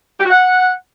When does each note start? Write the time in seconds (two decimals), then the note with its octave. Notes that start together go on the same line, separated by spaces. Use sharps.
0.20 G4
0.25 F#4
0.30 F#5